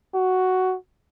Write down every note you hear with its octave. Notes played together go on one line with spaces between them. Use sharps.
F#4